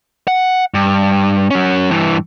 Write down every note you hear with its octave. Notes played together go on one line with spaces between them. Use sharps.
F#5
G2
F#3 C#4
G2 E3